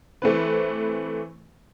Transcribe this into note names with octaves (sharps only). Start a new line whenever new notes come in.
E3 A3 C4 B4